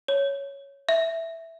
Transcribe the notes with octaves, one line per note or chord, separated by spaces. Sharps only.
C#5
E5